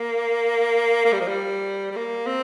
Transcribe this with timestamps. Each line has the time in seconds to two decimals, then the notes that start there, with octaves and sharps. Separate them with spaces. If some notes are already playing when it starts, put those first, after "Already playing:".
Already playing: A#3
1.05 A#3
1.12 G3
1.20 F3
1.28 G3
1.91 G3
1.96 A#3
2.27 C4